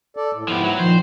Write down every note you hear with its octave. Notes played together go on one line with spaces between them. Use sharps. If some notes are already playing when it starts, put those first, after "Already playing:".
A4 D5
A2
G#2 F3 B3 E4 G4
F#3
A#2 D#3 F3 C5